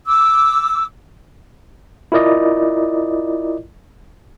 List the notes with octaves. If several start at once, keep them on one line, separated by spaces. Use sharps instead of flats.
D6 E6
E4 F4 A#4 D5 D#5